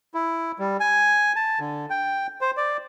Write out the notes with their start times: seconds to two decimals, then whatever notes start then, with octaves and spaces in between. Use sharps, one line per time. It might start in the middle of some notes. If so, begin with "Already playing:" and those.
0.14 E4
0.59 G3
0.80 G#5
1.36 A5
1.59 D3
1.90 G5
2.41 C5
2.57 D5